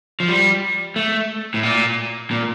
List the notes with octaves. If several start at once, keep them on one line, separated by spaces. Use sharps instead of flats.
F3
G3
A3
A2
A#2
A#2